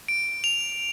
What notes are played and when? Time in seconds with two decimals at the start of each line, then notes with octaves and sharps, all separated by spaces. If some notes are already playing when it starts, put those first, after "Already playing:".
0.08 D7
0.44 F7